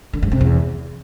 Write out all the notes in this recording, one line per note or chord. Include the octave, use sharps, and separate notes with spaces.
D3
G2
C3
E2